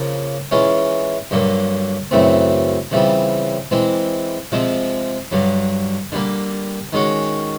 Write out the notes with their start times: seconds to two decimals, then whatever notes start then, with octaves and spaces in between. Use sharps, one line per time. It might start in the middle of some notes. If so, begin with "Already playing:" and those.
Already playing: C#3 F3 A#3
0.51 E3 G#3 C#4 F4
1.31 G2 D3 F#3 A#3
2.11 F#2 C#3 E3 A3 C4
2.91 C#3 E3 G3 C4 F4
3.71 E3 G#3 C4
4.52 C3 F3 G#3 C4
5.32 G2 D3 F#3
6.12 D3 G3 A#3
6.93 D#3 G#3 C#4 F#4